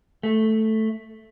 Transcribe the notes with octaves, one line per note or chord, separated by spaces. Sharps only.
A3